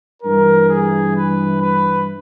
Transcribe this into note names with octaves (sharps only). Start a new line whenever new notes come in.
G2 E3 A#4
G#4
B4
B4